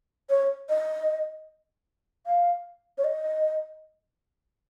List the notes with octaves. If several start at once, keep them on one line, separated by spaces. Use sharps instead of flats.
C#5
D#5
F5
C#5
D#5